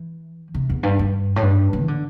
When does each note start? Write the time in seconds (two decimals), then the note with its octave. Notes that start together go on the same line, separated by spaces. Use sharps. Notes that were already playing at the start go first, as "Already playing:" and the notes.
Already playing: E3
0.54 C3
0.70 E2
0.83 G2
0.99 G2
1.36 A2
1.42 G2
1.73 A2
1.81 E3
1.88 D3